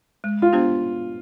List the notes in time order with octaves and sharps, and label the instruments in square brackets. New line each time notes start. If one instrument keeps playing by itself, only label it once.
[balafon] G#3
[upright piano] F4
[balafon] B3 D4 G4 C5